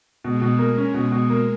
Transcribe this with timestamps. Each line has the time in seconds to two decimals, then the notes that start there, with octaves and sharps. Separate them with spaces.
0.23 B2 G#3
0.42 B2
0.59 A#3
0.77 C#4
0.94 B2
1.12 B2
1.30 A#3